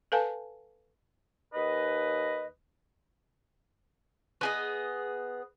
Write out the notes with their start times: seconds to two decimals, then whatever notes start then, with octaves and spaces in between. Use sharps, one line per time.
0.12 A4 B4 F5 G#5 A5
1.54 D#2 B4 D#5
4.41 B3 G#4 D#5